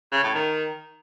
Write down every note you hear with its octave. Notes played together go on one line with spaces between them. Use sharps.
C#3
A2
D#3